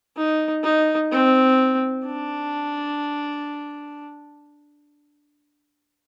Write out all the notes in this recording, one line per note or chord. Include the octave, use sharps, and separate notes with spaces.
D#4
D#4
C4
D4